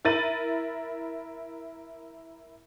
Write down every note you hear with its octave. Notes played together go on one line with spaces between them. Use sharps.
E4 A#4 A6 D#7 F#7